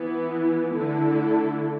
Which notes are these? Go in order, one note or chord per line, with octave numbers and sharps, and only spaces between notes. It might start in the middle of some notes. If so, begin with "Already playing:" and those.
Already playing: E3 B3 E4
D3 A3 E4 A4